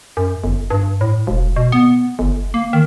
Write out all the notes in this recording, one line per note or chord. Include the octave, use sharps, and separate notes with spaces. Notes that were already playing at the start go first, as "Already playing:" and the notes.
F#2
G1
G2
A2
E1
B2
B3
G1
A#3
D#3